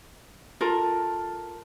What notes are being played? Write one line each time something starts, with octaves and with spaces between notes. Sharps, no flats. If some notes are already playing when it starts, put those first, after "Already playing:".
F4 A4 A#4